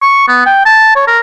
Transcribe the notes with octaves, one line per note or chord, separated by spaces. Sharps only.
C#6
B3
G5
A5
C#5
A#4